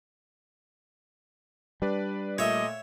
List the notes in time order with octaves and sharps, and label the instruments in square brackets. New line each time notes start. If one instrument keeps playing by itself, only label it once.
[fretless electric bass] G3 [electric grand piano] D4 B4 D5
[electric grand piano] A#2 A3 [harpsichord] C#5 E5 [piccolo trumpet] D#5